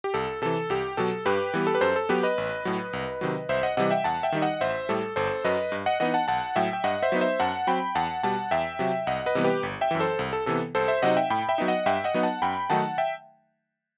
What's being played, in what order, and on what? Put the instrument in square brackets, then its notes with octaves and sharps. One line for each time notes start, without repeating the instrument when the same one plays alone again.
[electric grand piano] G4
C2 A4
C3 E3 A4
C2 G4
B2 F#3 A4
G2 G4 B4
E3 G3 B3
A4
B4
F#2 A4 C5
A4
F#3 B3 G4 B4
B4 D#5
A1
A2 F#3
C2
C3 D#3 F#3
C2 C5 E5
D#5 F#5
C3 E3 G3 D#5 F#5
E5 G5
E2 F#5 A5
E5 G5
D#3 G3 D#4
D#5 F#5
A1 C5 E5
A2 G3 A4
G1 A4 C5
F#2 F#3 B4 D#5
G2
D#5 F#5
E3 B3 D#4 D#5 F#5
F#5 A5
B1 F#5 A5
A2 F#3 E5 G5
G5
G2 D#5 F#5
C5 E5
F#3 B3 D#4
C5 E5
F#2 F#5 A5
F#3 C4 G5 B5
E2 F#5 A5
B2 G3 F#5 A5
E2 E5 G5
C3 F#3
C2 D#5 F#5
B4 D#5
C3 E3 G3 B3
G4 B4
G1
E5 G5
F#2 E3
A4 C5
C2
A4
C3 E3 B3 A4
C2 A4 C5
C5 E5
C3 F#3 C4 D#4 D#5 F#5
E5 G5
A2 G5 B5
E5 G5
F#3 B3 D#4
D#5 F#5
G2 E5 G5
D#5 F#5
F#3 B3 D#4
F#5 A5
F#2 G5 B5
D#3 F#3 A3 D#4 F#5 A5
E5 G5